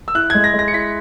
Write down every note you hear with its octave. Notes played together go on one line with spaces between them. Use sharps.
E6
E4 F#6
G#6
G#3
A#6
G#3
A#6
C#7
E4 B6